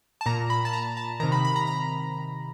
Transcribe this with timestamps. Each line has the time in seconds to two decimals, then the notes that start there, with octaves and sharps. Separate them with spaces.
0.21 A5
0.26 A#2 A#5
0.50 B5
0.65 A5
0.73 A#5
0.97 A5
1.20 C3 D#3 A#5
1.32 B5
1.45 B5
1.56 A#5
1.67 A#5